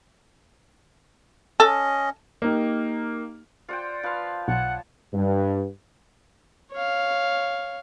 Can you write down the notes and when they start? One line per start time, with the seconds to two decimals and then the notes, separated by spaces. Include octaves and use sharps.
1.60 C#4 A4 D#5
2.42 A#3 D#4 G4
3.69 F4 C5 D5 F#5 G5
4.03 F3 B4 F5
4.48 B1 C#5 F#5 A5
5.14 G2
6.72 C#5 F5